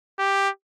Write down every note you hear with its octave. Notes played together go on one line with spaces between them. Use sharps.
G4